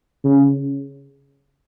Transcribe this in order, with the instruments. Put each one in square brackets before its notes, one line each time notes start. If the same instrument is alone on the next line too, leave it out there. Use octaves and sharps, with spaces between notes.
[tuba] C#3